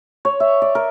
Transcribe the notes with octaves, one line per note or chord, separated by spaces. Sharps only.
C#5
E5
D5
A#4